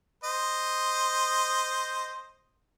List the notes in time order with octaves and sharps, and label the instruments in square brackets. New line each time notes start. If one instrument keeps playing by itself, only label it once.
[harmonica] C5 D#5